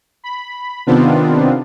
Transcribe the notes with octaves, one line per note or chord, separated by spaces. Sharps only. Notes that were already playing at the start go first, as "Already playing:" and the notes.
B5
C3 D#3 B3 C4 D4 F4